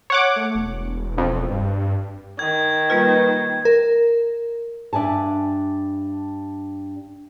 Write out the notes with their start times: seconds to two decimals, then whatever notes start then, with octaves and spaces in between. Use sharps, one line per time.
0.10 C#5 F#5 D6
0.36 A3
0.55 E1
1.18 F2
1.50 G2
2.39 D#3 G#6
2.90 G3 A#3 F4 B4
3.65 A#4
4.93 G2 D4 E5 G#5 A5